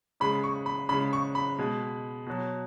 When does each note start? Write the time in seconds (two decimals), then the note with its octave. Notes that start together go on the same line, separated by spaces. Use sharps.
0.20 C#3 G#3 B5
0.44 C#6
0.66 B5
0.89 C#3 G#3 B5
1.13 C#6
1.35 B5
1.58 B2 G#3
2.26 B2 F#3